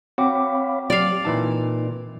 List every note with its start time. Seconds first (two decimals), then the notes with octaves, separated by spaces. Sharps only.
0.18 C4 F#4 C#5 F5 G5 B5 D6
0.90 F#3 G4 D5 F5
1.25 A#2 E3 D#4 A5